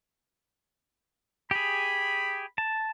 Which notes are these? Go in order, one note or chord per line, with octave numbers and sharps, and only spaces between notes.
G4 G#4 B5
A5